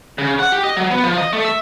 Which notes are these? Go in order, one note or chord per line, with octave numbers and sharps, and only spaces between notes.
C#3
F#5
G4
D#5
F#3
B3
F3
D#5
A3
E5